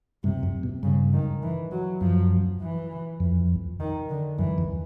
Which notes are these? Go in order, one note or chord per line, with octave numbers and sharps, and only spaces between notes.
G2 C3
F#2
B2
G2 C#3
D#3
E3
F#3
F#2 F3
E3
F2
D#3
D3
F#2 E3
E2